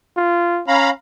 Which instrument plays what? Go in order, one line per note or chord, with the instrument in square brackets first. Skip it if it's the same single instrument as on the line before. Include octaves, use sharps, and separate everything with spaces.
[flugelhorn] F4
[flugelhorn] C#4 [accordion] F5 A#5 B5